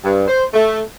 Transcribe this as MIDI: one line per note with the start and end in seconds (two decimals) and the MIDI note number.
0.03 0.25 43
0.28 0.44 72
0.53 0.80 57